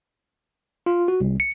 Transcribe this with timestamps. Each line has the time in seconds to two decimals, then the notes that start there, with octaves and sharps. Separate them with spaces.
0.86 F4
1.08 F#4
1.20 C2
1.40 C#7